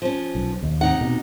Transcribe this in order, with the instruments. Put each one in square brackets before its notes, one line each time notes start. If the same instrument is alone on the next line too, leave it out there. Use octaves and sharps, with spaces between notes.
[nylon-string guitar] F3 C#4
[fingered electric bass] B1
D#2
[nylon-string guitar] C3 D#4 F#5
[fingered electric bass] B2